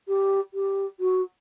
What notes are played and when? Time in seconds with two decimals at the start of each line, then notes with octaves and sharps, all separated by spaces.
0.08 G4
0.54 G4
1.00 F#4